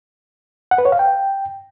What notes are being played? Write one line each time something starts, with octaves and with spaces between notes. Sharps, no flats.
F#5
B4
C#5
F5
G5